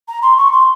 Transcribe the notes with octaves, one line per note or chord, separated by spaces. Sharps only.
A#5
C6
C#6
C6